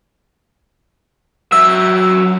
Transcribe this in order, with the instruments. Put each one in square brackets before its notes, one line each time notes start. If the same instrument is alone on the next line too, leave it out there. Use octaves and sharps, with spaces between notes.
[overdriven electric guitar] F#3 E5 [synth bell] E6